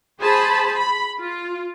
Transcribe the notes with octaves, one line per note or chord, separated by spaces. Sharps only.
G#4 C5 A5 B5
B5
F4